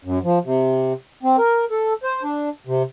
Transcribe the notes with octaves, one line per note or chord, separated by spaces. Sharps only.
F#2
F3
C3
C4
A#4
A4
C5
D4
C3